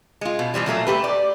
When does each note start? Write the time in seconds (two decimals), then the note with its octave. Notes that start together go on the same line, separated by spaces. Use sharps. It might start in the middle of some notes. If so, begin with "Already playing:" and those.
0.21 G#3 F4
0.39 B2
0.54 B2 E3 F3 G3
0.66 A#2 F#3 A3 A#3
0.87 A3 G4 B4
1.04 D5